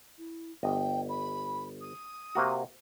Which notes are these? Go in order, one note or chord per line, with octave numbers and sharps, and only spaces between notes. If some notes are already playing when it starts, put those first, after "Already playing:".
E4
G1 D#5 G5
B5
D#6
C3 A#3 F#4